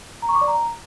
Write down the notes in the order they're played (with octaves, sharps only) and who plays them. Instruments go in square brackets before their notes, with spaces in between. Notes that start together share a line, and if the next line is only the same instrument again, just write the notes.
[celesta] A#5
C#6
D6
D5
A#5